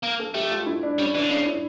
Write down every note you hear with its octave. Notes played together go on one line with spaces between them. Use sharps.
A#3 A#4
A4
A3 G4
F4
E4
D4
G3 C#4
E3 D4
D3
C#3 D4
E4